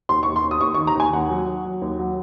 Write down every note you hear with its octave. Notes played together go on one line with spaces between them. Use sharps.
D#2 C6
D#2 C#6
C6
D#2
D#6
D#2 C#6
C#6
D#3
A#5
D#2 G#5
D#2 F#5
F#3
F#3
F#3
D#2
F#3